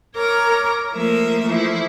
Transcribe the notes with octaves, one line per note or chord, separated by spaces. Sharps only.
A#4 C#5 A#5 D6
F3 A3 A#3 A#4 E5
E3 F3 A3 E4